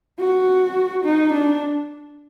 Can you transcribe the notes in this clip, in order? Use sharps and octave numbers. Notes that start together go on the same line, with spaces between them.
F#4
D#4
D4